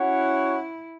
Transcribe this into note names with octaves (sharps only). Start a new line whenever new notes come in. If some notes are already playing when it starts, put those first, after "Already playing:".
Already playing: C#4 E4 F#4 C#5 F#5